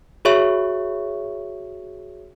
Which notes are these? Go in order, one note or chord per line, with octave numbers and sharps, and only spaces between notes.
F#4 G#4 C#5 E5 C#6